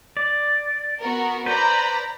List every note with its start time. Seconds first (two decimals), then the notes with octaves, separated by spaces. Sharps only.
0.17 D5
0.99 B3 F#4 A#4
1.46 B4 C5 D5 A#5 B5